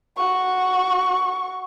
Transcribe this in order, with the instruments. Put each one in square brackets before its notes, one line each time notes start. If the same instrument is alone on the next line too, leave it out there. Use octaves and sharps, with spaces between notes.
[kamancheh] F#4 C#6